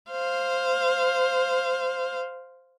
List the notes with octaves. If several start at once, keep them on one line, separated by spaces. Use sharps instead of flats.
C5 F5